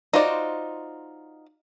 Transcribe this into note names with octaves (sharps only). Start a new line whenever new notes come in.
D#4 F4 F#4 C5 D5